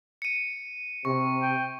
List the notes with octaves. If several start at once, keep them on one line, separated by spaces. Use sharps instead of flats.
C#7 D#7
C3 C#6
G5